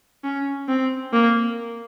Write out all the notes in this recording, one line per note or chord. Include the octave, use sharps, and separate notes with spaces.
C#4
C4
A#3